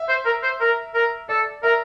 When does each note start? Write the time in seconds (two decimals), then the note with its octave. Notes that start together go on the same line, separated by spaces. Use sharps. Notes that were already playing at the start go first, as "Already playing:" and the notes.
Already playing: E5
0.08 C5
0.25 A#4
0.43 C5
0.60 A#4
0.94 A#4
1.29 A4 D5
1.63 A#4 E5